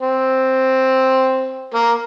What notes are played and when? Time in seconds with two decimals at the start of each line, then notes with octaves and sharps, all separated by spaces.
0.01 C4
1.74 A#3